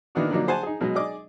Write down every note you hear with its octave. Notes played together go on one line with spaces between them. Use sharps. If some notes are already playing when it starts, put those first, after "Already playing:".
D#3 A#3 B3 D4 E4 F#4
D3 F3 F#3 A#3 D4 D#4
G#4 C5 F#5 G#5 A5
D#4 G#4
B2 F#3 G#3
G#4 D5 D#5 D6